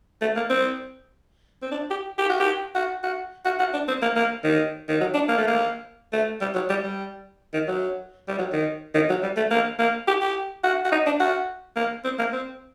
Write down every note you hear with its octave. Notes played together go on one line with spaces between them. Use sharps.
A3
A#3
C4
C4
D4
G4
G4
F#4
G4
F#4
F#4
F#4
F#4
D4
C4
A#3
A#3
D#3
D#3
F#3
D4
A#3
A3
A#3
A3
G3
F#3
G3
G3
D#3
F#3
G3
F#3
D#3
D#3
F#3
G3
A3
A#3
A#3
G4
G4
F#4
F#4
D#4
D4
F#4
A#3
C4
A#3
C4